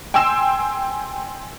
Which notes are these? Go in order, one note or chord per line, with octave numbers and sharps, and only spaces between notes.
G5 G#5 C6 E6 E7